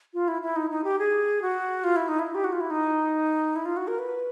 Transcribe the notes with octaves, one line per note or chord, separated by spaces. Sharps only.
F4
E4
E4
D#4
D#4
G4
G#4
F#4
F4
E4
D#4
E4
G4
F#4
F4
E4
D#4
E4
F4
F#4
A#4
B4